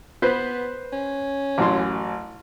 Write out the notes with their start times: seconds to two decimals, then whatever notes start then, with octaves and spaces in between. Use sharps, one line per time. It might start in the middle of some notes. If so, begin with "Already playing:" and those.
0.22 B3 B4 C5
0.92 C#4
1.58 A1 F#2 C6